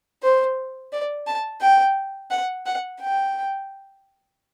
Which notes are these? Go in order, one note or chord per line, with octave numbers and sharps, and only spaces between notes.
C5
D5
A5
G5
F#5
F#5
G5